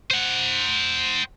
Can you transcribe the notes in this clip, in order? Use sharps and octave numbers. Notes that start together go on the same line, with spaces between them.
C5 F#5